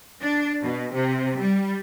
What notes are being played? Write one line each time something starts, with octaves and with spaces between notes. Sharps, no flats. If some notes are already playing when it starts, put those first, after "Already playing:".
D4
B2
C3
G3